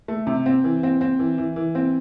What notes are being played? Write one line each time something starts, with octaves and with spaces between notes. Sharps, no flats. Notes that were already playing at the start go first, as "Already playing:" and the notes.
A3
C3
C4
E3
C4
C4
E3
E3
E3
C4